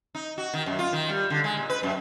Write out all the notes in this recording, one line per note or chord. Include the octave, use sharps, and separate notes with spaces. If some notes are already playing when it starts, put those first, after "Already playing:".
D#4
F#4
D#3
F#2
F4
D#3
G3
D3
G#3
A#2
B4
F#2